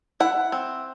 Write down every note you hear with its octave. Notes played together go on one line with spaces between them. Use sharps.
E4 F#5
C4